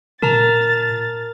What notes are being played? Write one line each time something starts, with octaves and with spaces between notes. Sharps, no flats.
A#2 A#4 A5 A#5 A6